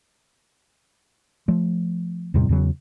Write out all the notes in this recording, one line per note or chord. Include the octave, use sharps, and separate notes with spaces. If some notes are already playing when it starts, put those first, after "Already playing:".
F3 A3
E2 A2 C3 G3
E2 C#3 F#3